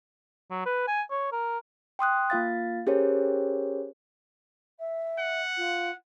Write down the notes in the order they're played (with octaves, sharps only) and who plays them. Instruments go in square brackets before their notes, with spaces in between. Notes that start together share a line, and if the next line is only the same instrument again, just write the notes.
[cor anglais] F#3
B4
G#5
C#5
A#4
[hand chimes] G5 C6 D#6 F#6
A#3 F4 F5 A6
C#4 G4 G#4 A#4 C5 C#5
[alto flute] E5
[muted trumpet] F#5
[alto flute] F4